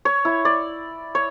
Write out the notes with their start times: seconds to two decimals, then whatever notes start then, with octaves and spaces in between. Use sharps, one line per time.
0.05 C#5
0.25 E4
0.45 D5
1.15 C#5